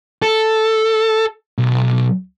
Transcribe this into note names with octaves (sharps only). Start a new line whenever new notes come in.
A4
B1